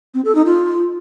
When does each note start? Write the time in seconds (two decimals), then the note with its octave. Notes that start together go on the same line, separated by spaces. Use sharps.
0.14 C4
0.24 A4
0.35 D#4
0.45 F4